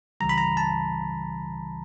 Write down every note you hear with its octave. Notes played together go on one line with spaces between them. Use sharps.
C#2 C#3 E3 G3 A#5
B5
A#5
A5